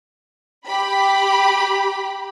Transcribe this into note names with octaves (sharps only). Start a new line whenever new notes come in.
G4 B5